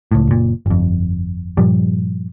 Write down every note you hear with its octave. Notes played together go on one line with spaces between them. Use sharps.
C#2 A2
F#1 A#2
G1 F2
G2 A#2 F3 G3